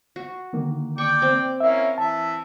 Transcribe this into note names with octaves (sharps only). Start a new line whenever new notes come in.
F#4
D3 D#3 A#3
D5 G5 C#6 D6
C4
A#3 C#4 E4 E5
E3 E5 A5